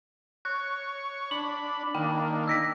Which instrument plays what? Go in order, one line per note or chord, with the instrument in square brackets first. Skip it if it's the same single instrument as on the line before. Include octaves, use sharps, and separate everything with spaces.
[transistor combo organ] C#5 C#6 [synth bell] F#6
[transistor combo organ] D4 B5 [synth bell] F#7
[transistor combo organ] D#3 A#3 D4 [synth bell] G5
[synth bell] E6 A#6 B6